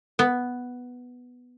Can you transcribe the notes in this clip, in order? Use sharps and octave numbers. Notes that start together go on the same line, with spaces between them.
B3